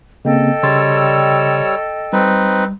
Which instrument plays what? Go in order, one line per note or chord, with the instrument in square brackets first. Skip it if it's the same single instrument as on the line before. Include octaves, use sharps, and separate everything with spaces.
[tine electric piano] C#3 A#3 C4 [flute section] A4 D#5 G5
[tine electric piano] C#3 C6 A6 [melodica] G3 C#5 E6
[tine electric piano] G3 [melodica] C4 D#4 B4